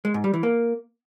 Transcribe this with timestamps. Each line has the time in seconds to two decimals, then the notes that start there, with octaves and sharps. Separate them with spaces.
0.05 G#3
0.14 G#2
0.24 G3
0.34 E3
0.43 A#3